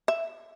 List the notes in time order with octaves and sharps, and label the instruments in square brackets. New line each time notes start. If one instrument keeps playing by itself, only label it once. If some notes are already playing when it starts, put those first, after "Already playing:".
[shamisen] E5